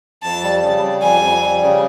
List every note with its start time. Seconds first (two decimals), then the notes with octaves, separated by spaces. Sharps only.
0.23 F2 A5
0.43 G3
0.62 C#3
0.82 G3
1.02 F2 G#5
1.22 F2
1.42 G3
1.62 C#3